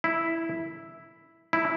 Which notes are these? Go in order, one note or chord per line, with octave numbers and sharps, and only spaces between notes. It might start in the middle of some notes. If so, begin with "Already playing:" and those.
E4
E4